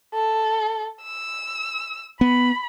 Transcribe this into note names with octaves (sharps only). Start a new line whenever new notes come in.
A4
E6
B3 B5